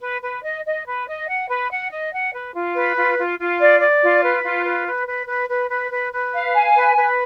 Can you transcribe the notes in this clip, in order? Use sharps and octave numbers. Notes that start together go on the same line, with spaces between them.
B4
B4
D#5
D#5
B4
D#5
F#5
B4
F#5
D#5
F#5
B4
F4
B4
F4
F4
F4
D5
D5
F4
B4
F4
B4
B4
B4
B4
B4
B4
B4
B4
F5
G#5
B4
B4